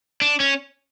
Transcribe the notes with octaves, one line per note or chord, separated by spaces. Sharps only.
D4
C#4